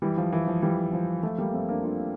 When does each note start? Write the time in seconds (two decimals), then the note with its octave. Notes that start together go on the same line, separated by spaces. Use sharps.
0.02 E3 G3
0.17 F3
0.32 E3
0.48 F3
0.62 E3 G3
0.93 F3
1.23 F3 A3
1.38 G3 A#3
1.53 A3 C4
1.69 A#3 D4
1.84 D4 F4